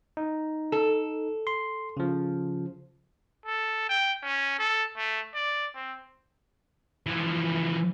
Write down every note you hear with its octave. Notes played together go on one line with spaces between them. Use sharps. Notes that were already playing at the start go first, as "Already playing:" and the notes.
D#4
A4
C6
C#3 F3
A4
G5
C#4
A4
A3
D5
C4
E3 F3